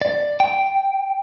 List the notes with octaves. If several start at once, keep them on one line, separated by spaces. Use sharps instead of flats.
D5
G5